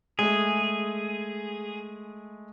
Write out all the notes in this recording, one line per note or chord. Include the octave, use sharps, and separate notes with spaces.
G#3 A3 G#4